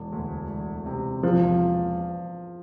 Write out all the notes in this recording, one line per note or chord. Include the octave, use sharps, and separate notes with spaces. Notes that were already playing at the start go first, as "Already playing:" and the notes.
Already playing: E1
D2
E1
C3
E1 F3